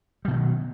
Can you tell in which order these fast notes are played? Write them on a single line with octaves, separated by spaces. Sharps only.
G3 B2 D#3 F#3